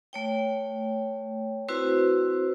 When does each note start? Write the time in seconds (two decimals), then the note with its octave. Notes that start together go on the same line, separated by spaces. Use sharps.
0.13 A3 C#5 G5
1.69 C4 E4 F#4 B4 C5